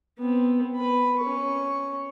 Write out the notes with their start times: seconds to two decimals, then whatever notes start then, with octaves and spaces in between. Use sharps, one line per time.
0.19 B3 C4
0.76 B4 B5
1.20 C#4 C#6